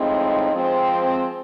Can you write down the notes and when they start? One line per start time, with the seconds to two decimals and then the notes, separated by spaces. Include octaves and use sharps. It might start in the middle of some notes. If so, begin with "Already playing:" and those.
Already playing: A2 F3 G#3 C4 D#4
0.53 F3 G#3 C4